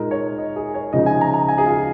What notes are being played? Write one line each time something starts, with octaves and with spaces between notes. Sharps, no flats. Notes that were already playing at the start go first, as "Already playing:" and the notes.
Already playing: A#2 G#3 D#4 A#4
C#5
D#5
G#4
C#5
C#3 F3 G#3 D#4 D#5
G#5
A#5
A#5
G#5
G#4
F4